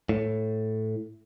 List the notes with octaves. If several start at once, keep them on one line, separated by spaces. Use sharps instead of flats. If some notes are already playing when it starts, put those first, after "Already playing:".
A2